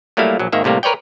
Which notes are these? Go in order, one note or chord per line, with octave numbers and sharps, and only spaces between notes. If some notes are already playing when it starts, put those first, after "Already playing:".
F#3 G3 A3 A#3 E4 F5
A#1 F#3
G#1 D#3 A#3 E5
A2 C3 G3 A#3
A#4 B4 C#5 D5 G5